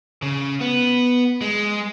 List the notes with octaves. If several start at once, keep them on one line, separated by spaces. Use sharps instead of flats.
C#3
B3
G#3